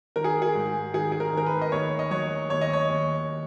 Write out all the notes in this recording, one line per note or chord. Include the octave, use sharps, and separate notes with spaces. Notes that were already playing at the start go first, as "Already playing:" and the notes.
D#3 A#4
G#4
G#4
G#2
D#3 G#4
G#4
A#4
D#3 A#4
B4
D#5
D#2 C#5
D#5
F#3 C#5
D#2 C#5
D#5
C#5
D#2